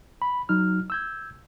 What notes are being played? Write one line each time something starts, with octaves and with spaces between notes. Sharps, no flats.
B5
F#3 D#4 F6
E6 G6 G#6